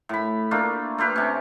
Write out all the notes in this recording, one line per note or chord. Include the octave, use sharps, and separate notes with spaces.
A2 B5
A3 A#3 D4 F4
A3 F4 G4 B4
C3 C#4